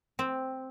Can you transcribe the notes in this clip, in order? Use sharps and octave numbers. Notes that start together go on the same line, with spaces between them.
C4